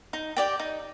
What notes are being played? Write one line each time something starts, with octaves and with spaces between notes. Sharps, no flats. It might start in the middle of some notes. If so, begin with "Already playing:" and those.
D#4
G4 D5 G5
D#4